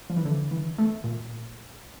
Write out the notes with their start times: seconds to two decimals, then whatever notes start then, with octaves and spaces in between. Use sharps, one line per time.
0.10 F3
0.17 E3
0.25 D3
0.51 E3
0.78 A3
1.04 A#2